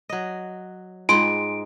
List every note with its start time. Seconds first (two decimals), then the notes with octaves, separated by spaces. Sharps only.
0.09 F#3 D#5
1.09 G#2 G#3 F4 G5 C6 D7